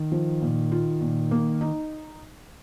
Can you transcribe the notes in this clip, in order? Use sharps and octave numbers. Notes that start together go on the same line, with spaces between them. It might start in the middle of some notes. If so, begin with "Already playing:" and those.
Already playing: D#3
F3
A#2
F4
A#2
A#3
D#4